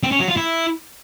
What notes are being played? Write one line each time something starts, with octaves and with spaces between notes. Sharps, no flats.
C4
C#4
F#3
F4
E4